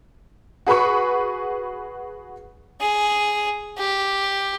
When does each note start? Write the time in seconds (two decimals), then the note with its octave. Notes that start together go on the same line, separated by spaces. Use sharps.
0.67 F#4 G#4 B4 B5 C#6
2.81 G#4
3.78 G4